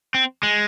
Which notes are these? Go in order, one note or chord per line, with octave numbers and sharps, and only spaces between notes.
C4
G#3